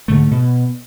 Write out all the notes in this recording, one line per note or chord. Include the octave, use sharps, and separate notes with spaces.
D2 G#2 D3 A3
B2